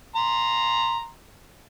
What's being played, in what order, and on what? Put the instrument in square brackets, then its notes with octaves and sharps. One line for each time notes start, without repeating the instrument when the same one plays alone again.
[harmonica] A#5 C6